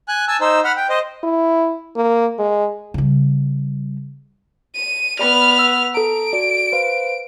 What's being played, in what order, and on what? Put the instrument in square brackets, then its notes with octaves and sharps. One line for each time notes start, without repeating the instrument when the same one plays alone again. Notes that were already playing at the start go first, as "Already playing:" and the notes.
[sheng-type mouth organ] G#5 F#6
G#5 A5 E6
D#4 C5 E6
F#5 B5 F6
G5
C5 D#5
[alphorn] E4
A#3
G#3
[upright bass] C#3 G3
[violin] D#7
[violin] B3 F6 [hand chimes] D5 B5
[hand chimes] F#5 E6
[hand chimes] A4 A#5 [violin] D7
[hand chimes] F#4 D5
B4 C5 F5